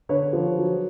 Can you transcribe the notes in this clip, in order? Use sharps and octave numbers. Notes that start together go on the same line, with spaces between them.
D3 B4 C#5
F3
F#3